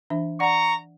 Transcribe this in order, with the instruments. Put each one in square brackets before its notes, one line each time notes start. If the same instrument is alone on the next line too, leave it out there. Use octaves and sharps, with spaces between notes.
[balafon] E3 D4 E5
[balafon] D5 F#5 [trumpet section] A#5 C#6